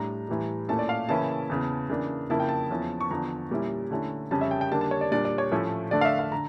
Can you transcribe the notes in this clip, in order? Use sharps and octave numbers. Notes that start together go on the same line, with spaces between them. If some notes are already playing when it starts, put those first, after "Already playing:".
Already playing: A2 G3 D4 A#5
A2 E3 G3
A#2 A3 C#4 E4 A5
D5
F5
C#3 E3 A#3 C#4 E4 A5
E2 C#3 E3
C#3 E3 A#3 D4
F2 C#3 F3 A#3 E4 A5
G5
A5
E2 C#3 F3 C#4 E4
C#6
E2 D3 F3 A#5
A#2 G3 C#4 E4
D3 A3 C#4 E4
F2 C#3 G3 C#4 A5
E5
G5
G5
D3 G3 A#3 D4 A5
A5
C#5
D5
A#2 G3 A#3 D4 D5
D5
C#5
A2 F3 A3 C#4 E4
D3 A3 D4 D5
F5
E5
F5
D3 A#5